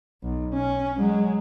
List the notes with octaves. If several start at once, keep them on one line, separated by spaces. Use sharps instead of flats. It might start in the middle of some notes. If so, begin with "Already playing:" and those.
B1
C#4
F#3 G#3